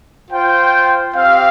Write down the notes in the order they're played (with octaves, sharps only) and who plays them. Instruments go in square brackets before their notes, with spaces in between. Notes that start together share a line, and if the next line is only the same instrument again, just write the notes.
[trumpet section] F4 C5 G5
C4 G4 F5